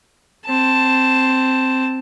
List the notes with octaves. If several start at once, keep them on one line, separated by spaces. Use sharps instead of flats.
C4 A5